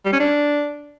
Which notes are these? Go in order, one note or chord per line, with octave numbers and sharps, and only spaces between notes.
G3
C#4
D4